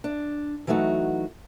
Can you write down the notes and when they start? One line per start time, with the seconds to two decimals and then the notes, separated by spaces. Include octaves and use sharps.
0.04 D4
0.67 E3 F#3 A3 D#4 F#4